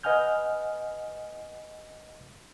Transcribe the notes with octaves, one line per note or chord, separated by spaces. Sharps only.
B4 D#5 F#5 G#5 F6 G6